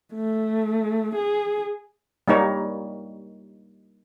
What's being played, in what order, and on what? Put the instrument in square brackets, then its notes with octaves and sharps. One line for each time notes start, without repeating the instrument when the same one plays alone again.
[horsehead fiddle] A3
G#4
[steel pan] G3 A#3 D#4 C#5